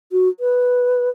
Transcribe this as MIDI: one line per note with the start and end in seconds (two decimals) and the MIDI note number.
0.12 0.29 66
0.40 1.10 71